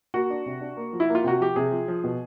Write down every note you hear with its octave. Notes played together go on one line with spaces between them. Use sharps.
A#3 F#4
D4
C3
D4
A#3
F3
E4
A#3
F4
C3 F#4
F3 G4
C3 G#4
F3
F3
B2